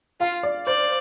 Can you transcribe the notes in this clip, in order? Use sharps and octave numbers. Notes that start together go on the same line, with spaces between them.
F4 F5
D5
C5 D5